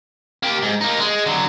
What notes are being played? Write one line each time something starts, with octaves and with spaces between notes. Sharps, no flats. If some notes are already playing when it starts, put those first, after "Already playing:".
A#3 G4
G#2
A#3 D#4
G#3
D3 F#3